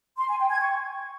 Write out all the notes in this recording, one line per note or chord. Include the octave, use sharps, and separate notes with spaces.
C6
G#5
G5
G#6
C#6